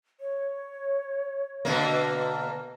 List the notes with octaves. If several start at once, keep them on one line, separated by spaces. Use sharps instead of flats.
C#5
B2 D3 A#3